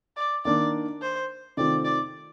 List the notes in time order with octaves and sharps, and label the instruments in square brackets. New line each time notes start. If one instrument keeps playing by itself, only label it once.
[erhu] D5
[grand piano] D#3 A#3 D4 [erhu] D5
[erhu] C5
[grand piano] C3 D#3 A3 C4 F4 [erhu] D5
[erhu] D5